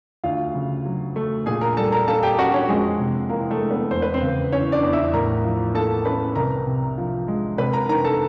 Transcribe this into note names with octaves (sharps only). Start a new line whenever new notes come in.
D2 F4 F5
C#3
F#3
A3
A#2 G#4 G#5
A#4 A#5
G3 A4 A5
A#4 A#5
A#3 A4 A5
G4 G5
C#4 F#4 F#5
C#4 C#5
F2 G#3 G#4
C3
E3 A#3 A#4
A3 A4
G#3
B3 B4
E2 C5
B4
C4 C5
C#3
E3 C#4 C#5
D4 D5
E2
E4 E5
A2 A#4 A#5
F3
A#3 A4 A5
C#4 B4 B5
C2 A#4 A#5
C3
F3
G#3
C3 B4 B5
A#4 A#5
D#3 A#4 A#5
A4 A5